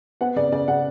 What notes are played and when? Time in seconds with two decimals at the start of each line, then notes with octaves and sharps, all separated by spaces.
0.21 B3 F#5
0.36 C#3 D5
0.52 C#3 D5
0.68 C#3 F#5